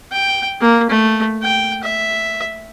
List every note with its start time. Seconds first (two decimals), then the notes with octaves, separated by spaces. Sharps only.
0.12 G5
0.61 A#3
0.90 A3
1.42 G5
1.83 E5